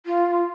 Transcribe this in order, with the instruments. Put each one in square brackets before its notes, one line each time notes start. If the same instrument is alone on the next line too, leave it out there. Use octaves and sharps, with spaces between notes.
[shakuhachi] F4